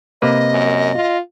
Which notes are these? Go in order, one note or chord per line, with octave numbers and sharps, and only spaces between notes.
C3 A#3 B4 D#5
F#2
F4